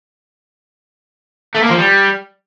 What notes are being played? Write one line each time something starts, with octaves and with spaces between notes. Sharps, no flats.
A3
A#3
F3
G3